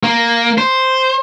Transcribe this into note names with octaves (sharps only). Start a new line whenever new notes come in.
A#3
C5